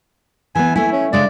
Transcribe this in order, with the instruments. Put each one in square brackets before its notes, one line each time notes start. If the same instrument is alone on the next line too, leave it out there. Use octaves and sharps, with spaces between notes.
[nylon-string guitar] E3 B3 [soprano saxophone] G#5
[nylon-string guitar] A3 E4 [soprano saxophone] G#5
[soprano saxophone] C#4
[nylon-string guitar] C#3 G#3 D4 [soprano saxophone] D5